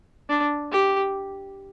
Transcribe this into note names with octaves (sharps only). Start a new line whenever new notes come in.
D4
G4